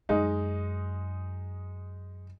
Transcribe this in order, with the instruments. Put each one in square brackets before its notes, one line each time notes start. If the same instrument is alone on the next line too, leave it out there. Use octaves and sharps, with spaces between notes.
[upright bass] F#2 [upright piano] G#3 D#4